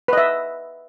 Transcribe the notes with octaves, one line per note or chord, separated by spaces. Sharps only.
B4 D#5 E5